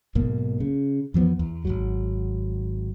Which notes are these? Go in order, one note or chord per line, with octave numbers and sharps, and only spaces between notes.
B1 G#2 B2 A#3
C#3
F2 E3 F3 B3
E2
G#1 E2 F#3